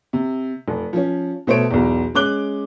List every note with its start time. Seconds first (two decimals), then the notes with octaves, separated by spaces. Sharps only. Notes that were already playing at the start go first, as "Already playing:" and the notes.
0.13 C3
0.68 F1
0.93 F3 C#4
1.47 B2 A3 C5 C#5 D7
1.71 B1 E2
2.15 G#3 C#4 D6 F#6 G7